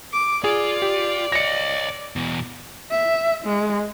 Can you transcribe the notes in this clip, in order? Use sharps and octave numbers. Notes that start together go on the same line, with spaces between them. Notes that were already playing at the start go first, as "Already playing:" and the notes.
D6
F4 G#4 D5
G4
C#5 D#5 A#6 C#7
E2 B2
E5
G#3